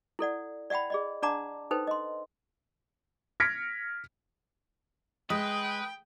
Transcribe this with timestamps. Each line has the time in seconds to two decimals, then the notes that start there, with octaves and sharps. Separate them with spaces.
0.19 E4 A4 D5 F#5
0.70 D5 E5 F#5 G5 B5
0.90 G#4 D5 D#5
1.22 D4 D5 F#5 A5 A#5 D6
1.71 D#4 A4 B4 C5 G5
1.87 D#5 C6
3.40 F6 G#6 A#6 B6 C#7 D7
5.30 G#3 B4 G5 D#6